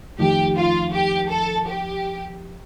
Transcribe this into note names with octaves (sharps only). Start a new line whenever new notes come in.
F2 D#3 A3 G4
F4
G4
A4
G4